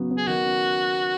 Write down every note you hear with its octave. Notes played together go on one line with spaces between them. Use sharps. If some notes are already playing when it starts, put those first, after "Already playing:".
Already playing: C#3 F#3 B3
B3
G#4
D#3 F#4
C#4